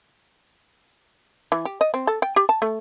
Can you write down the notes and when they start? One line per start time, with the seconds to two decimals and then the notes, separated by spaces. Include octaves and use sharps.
1.52 E3
1.65 G4
1.81 D#5
1.94 C4
2.07 A4
2.22 G5
2.36 G4
2.49 A5
2.62 A3